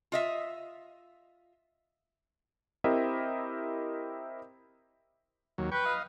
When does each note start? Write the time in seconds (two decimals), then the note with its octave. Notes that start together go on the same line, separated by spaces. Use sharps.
0.12 F4 D#5 E5
2.84 C4 E4 G4 A#4 D#5 E5
5.58 D#2 F#3
5.72 B4 G5 C#6
5.85 D#5 F5